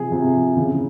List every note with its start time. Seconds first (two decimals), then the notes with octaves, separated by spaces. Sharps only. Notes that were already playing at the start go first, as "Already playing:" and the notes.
Already playing: C3 F3 G#4
0.11 C3 F3
0.57 C#3 E3